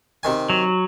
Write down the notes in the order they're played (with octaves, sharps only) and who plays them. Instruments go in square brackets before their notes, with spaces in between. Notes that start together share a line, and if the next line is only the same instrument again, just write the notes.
[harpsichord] C3 D#3 G#5
[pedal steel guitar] F#3